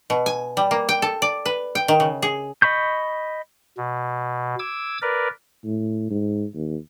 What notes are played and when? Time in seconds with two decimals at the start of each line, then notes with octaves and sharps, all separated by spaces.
0.10 B2
0.26 G#5
0.57 G3
0.71 A#3
0.89 G5
1.02 A4
1.22 D5
1.45 B4
1.75 G5
1.88 D#3
2.00 C#3
2.22 G#4
2.62 D#5 B5 C#6 G6
3.77 B2
4.59 D6 E6 G#6
5.02 A#4 B4 D5
5.64 A2
6.10 G#2
6.54 D#2